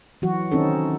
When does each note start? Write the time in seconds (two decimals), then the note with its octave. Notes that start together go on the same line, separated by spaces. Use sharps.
0.22 E3 F#3 F#4
0.52 D#3 C4 C#4 D#4 A4